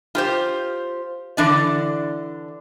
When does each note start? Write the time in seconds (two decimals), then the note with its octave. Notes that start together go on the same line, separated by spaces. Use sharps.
0.15 F4 G4 C5
1.37 D3 E3 D4 D5